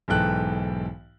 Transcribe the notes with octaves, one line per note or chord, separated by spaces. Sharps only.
B1 G#2 E3 A4 G5 F#6